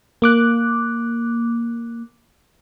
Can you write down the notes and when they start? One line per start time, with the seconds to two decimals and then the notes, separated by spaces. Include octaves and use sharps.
0.22 A#3 D6 F#6